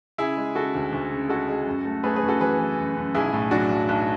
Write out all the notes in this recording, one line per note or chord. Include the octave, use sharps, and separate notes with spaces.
C#3 E4 G#4
G#3
C#3 F#4 A4
D2
D2
C#3
G#3 F#4 A4
G#3
F#2
A3
A3 G#4 B4
G#4 B4
F#2
F#4 A4
E3 G#4 B4
E3
F#2
F#2
B1 E4 G#4
A2
F#3 D4 F#4
B1
B1